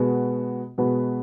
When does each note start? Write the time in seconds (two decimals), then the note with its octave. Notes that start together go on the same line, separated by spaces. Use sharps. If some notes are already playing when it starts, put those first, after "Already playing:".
Already playing: B2 G#3 B3 F#4 B4
0.78 B2 G#3 B3 F#4 B4